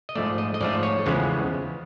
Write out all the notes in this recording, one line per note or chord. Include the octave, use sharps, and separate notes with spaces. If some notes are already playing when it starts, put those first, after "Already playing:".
D#5
G#2 F3 A3 D5
D#5
D#5
G#2 F3 A3 D5
C#5
E2 C#3 F3 G#3 B3